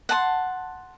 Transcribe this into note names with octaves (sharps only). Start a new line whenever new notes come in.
F#5 A5 C6